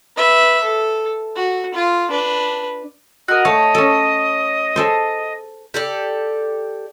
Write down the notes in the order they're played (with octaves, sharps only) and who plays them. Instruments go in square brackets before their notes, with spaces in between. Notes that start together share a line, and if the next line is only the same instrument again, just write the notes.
[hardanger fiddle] B4 E5
A4
F#4
F4
D4 B4
[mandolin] F#4 A#4 [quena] D#5
[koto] A3 F5 [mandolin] C#5
[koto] C#4 A4
G#4 A4 C5
[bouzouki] G4 A4 D5